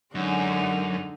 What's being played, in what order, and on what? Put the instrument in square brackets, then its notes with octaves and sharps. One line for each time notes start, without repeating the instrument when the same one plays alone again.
[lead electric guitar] F#2 [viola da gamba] D3 G#3 D#4